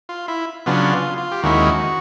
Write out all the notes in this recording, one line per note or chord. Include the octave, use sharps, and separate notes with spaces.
F4
E4
C#3 F#3 B3 D4 F4
F4
F4
G4
D#2 D#3 G#3 C#4 E4 F#4